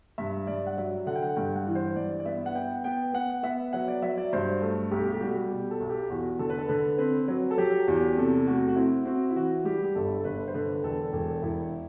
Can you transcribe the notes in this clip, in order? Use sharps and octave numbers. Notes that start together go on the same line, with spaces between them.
G2 E5
G2 D5
F#5
F#3 E5
D3 F#5
G5
F#5
G2 G5
F#5
E3
C5
G2 D5
D5
B3 E5
F#5
B3 G5
B3 G5
B3 F#5
B3 E5
F#3 F#5
D5
F#3 E5
D5
G2 C5
A3 A4
B1 G4
G4
G3 F#4
B2 G4
A4
B1
G4
E2 F#4
D3 A4
B4
A4
D3 B4
C4 B4
F#3
A4
F#3 G4
E2 G4
C3 A4
A3 F#4
F#4
C4 E4
C4 F#4
E4
E3 F#4
G3 G4
G4
G1 A4
A4
G1 B4
C5
D3 B4
E1 A4
E1
E1 E4